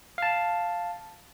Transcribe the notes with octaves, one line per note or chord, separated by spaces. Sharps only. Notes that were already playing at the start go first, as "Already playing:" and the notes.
F5 A5